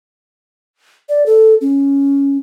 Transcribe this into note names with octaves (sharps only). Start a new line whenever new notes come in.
D5
A4
C#4